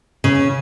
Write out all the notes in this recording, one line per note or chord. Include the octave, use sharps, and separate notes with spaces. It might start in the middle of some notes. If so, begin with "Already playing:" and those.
C#3